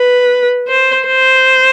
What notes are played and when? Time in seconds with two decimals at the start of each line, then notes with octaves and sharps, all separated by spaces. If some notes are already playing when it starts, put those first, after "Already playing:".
Already playing: B4
0.68 C5
1.07 C5